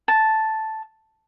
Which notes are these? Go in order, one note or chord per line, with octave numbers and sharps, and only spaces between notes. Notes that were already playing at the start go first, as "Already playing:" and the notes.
A5